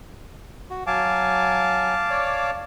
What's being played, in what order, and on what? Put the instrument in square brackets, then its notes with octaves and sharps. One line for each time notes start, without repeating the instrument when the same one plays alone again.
[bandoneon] F#4
[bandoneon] F#3 G#5 [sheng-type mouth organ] F5 A5 D6
[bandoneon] C#5 D5